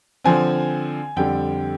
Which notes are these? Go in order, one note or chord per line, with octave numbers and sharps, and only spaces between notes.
D3 F3 C4 G#5
F2 D3 G3 G5